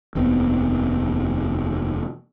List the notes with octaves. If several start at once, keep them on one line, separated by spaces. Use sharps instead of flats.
F1 D#2 B3 C4